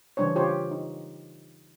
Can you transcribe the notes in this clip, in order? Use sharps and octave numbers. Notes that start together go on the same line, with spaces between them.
C#3 E3 G3 D4 C5 C#5
C#3 F4 G4 C5 C#5
D#4